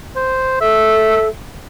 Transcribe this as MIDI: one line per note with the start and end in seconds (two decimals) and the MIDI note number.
0.16 0.59 72
0.61 1.29 69
0.61 1.26 76